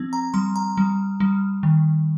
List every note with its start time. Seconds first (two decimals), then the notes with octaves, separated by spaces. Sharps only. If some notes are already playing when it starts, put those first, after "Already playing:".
Already playing: F3 C4
0.13 A#5
0.34 G3 C6
0.56 A#5
0.78 G3
1.20 G3
1.63 D#3